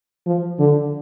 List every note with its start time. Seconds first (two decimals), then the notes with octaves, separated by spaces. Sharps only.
0.26 F3
0.59 D3